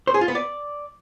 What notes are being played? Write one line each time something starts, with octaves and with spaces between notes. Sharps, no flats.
C5
G#4
F4
B3
D5